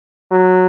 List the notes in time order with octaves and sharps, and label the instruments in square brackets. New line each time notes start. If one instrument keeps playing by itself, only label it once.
[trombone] F#3